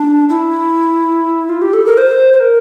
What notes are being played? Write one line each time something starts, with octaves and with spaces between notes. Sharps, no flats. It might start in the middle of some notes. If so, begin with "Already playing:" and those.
Already playing: D4
E4
F4
G4
A4
A#4
C5
C5
A#4